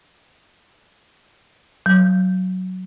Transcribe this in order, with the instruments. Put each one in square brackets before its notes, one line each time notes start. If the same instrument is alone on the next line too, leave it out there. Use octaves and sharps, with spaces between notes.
[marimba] F#3